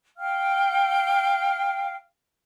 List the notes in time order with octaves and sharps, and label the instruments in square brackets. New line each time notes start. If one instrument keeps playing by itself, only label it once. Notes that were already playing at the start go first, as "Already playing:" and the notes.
[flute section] F5 G5 F6